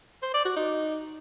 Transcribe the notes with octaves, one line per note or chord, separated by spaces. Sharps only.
C5
D5
F#4
D#4